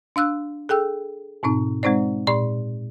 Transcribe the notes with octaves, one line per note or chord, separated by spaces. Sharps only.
D4 F5 E6 F#6
G#4 A4 G5 E6
G#2 B2 C4 D#4
G#3 C4 D#4 C5 D5
A#2 D5 C6 C#6